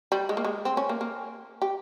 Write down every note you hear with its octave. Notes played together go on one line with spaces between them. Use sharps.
G3
G#3
A#3
G#3
C4
C#4
A#3
A#3
G4